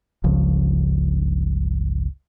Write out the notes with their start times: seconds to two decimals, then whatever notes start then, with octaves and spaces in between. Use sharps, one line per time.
0.24 G1 C#2 C#3 F3